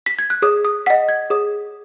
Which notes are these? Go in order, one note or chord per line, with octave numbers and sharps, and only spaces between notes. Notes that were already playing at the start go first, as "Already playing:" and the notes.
B6
G#6
F#6
G#4 D#6
D#6
D#5 F#5 B6
G#6
G#4 D#6